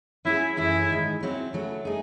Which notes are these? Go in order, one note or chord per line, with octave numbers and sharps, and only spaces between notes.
F#3 C#4 E4 G#4
F#2 E3 A3 C#4 E4 G#4
G#2 D#3 G#3
C#3 F#3 C4 E4
C#3 F#3 A3
A3 D#4 G#4